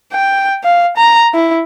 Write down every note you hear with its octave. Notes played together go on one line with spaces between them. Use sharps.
G5
F5
A#5
E4